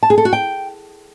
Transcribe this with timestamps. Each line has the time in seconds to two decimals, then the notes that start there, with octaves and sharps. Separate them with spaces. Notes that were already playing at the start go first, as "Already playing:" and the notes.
0.03 A5
0.10 G#4
0.18 A4
0.25 F#4
0.33 G5